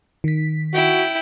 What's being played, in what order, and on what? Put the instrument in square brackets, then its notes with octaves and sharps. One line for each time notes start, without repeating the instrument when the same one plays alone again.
[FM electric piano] D#3 B6
[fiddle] E4 G5 [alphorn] F#4